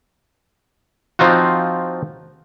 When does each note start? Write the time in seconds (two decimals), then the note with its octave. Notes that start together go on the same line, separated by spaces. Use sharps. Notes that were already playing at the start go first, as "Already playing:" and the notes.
1.19 F3 C4 D#4 F4 F#4